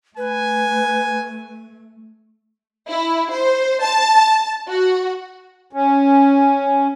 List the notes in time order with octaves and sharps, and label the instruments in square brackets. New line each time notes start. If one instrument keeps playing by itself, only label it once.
[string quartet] A3 [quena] B4 [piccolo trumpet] G#5
[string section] E4
C5
A5
F#4
[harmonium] C#4